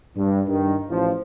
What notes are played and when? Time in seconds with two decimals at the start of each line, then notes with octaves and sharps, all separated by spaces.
0.16 G2
0.47 G2 D#3
0.88 A1 F3